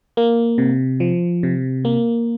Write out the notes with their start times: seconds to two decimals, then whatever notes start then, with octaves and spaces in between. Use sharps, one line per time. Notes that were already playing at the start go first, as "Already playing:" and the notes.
0.17 A#3
0.58 C3
1.00 F3
1.43 C3
1.85 A#3